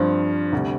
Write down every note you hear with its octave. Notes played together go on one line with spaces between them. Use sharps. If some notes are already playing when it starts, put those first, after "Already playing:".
Already playing: G2 F3 C4 F4
D2 C3 G3